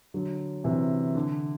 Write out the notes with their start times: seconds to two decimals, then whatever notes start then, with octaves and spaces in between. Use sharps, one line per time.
0.14 D3 F#3
0.64 C3 E3
1.15 D3